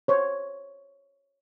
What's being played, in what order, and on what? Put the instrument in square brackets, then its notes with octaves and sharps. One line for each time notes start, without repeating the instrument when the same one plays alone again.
[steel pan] C5 C#5